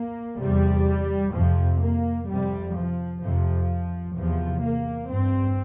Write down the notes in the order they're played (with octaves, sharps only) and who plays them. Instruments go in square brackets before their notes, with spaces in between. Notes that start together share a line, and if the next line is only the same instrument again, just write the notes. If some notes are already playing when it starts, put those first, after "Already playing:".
Already playing: [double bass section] A#3
E2 C3 G3
F2 C3 F3
A#3
F2 C3 G3
F3
F2 C3 F3
E2 C3 F3
A#3
G2 C4